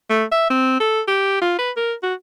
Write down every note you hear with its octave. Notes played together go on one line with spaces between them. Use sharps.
A3
E5
C4
A4
G4
F4
B4
A#4
F#4